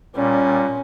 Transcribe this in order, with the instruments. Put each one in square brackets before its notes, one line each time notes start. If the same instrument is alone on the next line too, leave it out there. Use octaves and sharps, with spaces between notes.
[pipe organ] A#2 G3 [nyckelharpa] C#4